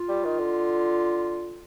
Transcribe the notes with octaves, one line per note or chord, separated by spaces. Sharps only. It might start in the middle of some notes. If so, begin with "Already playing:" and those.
Already playing: F4
G3
D#3
D3